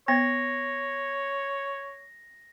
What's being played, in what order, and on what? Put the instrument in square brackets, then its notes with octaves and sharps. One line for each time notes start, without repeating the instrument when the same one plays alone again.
[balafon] B3 [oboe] C#5 [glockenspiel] A#6